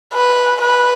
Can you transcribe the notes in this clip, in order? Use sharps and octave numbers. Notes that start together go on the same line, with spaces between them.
B4
B4